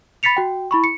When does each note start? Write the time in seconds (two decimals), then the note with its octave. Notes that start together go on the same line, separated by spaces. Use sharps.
0.23 B5 A6 B6 C#7 F7
0.37 F#4 G5
0.71 E4 B5 C#6
0.84 C#7